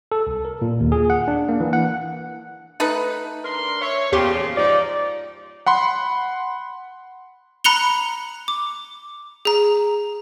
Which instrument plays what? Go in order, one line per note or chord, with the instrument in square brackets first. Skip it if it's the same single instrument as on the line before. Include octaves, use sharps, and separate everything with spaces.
[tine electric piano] A4
C2
A#4
A#2
D#2
G#4
F#5
D4
A#3
E3
F#5
[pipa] A3 D#4 B4
[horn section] D4 A#4 C6
[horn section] C#5 [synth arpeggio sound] E5
[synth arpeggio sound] E2 G4 C6 [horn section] A#2 C#3 F3
[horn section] G#2 F3 D#4 [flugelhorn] D5
[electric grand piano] F#5 B5 C6
[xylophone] A#5 B5 F#6 C#7 F7 G7
D6
G#4 A#5